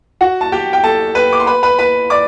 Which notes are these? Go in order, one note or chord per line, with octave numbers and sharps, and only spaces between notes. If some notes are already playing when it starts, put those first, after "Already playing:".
F#4 F#5
A5
G4 G5
G5
A4 A5
B4 B5
D6
C6
B4 B5
B4 B5
B4 B5
D5 D6